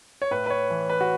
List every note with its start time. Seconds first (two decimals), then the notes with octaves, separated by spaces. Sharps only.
0.22 C#5
0.31 A2 B4
0.46 B4
0.50 C#5
0.70 E3
0.89 B4
1.01 F#4